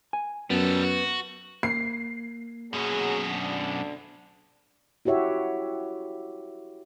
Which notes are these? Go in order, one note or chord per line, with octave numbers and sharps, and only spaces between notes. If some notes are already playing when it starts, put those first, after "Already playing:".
G#5
F#2 G3 B3 A4
F#4
A#3 C7
F#2 B2 F#3 G#4
D2 D3 D4
E4 F#4 G4 C#5 E5